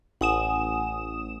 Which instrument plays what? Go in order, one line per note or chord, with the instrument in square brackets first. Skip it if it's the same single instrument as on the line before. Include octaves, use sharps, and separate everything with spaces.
[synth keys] A1 D#6 E7 [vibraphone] F#5 G#5